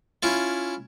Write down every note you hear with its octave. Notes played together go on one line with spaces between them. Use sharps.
C#4 E4 F4